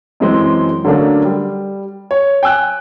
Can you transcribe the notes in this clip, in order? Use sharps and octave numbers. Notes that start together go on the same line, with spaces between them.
F#2 E3 G#3 C4
D3 F#3 A3 A#3 C#4 D4
G3
C#5
G5 G#5 E6 F#6